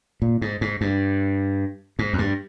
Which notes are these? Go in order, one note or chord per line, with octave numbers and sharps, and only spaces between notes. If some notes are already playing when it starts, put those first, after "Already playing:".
A#2
G#2
G#2
G2
G#2
F2
G2